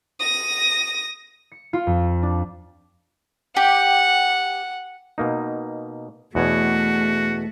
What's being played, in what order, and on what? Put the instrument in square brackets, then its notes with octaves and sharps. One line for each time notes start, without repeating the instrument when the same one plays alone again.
[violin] D#6 A#6
[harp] C#7
F4
F2
D4
[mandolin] G4 [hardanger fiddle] F#5
[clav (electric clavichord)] B2 A#3 D#4
[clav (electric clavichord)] E2 B2 C#5 [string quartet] A3 [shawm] F#4